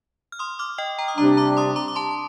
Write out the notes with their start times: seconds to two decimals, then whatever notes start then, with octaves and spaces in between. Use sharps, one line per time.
0.32 F6
0.39 C6 D#6
0.59 D6 F6
0.78 D#5 G5
0.98 G5 A#5
1.08 D#6
1.18 C3 G3 D4 A#5 D6
1.37 A#5 D6
1.57 C6 D#6
1.76 A#5 D6
1.88 D6
1.96 A5 C6
2.11 C6